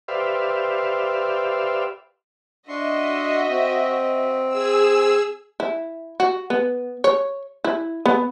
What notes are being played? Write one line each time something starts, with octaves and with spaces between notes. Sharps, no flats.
G4 B4 C5 D5 E5 F5
D4 F#4 D#5 E5 C6 C#6
C4
G#4 E6
E4
F#4
B3
C#5
E4
B3